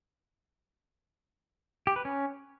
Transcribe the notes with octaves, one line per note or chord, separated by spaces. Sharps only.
G4
B4
C#4